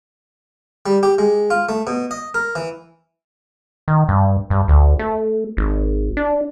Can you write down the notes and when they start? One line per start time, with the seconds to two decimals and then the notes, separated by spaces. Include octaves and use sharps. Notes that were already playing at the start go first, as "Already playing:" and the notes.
0.86 G3
1.03 G4
1.18 G#3
1.50 F4
1.69 A3
1.87 B2
2.11 D#5
2.34 A#4
2.55 E3
3.88 D#3
4.08 G2
4.50 G2
4.68 D2
4.99 A3
5.57 G#1
6.17 D4